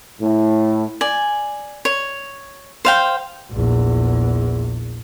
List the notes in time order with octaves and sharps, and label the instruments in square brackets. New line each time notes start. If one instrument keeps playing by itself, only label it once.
[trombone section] A2
[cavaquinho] D5 G#5
C#5
C5 F5 G5
[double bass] A#1 E2